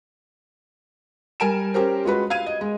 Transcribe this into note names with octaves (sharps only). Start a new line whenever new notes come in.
G3 A#4 G#5 D7 E7
C#4 G4 A#4 C5
G#3 F4 F#4 B4
F5 G#6 D#7
D#5
G#3